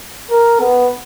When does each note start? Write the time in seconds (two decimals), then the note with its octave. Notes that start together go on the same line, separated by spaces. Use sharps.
0.30 A#4
0.60 B3